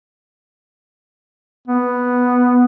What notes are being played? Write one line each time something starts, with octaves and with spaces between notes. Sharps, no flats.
B3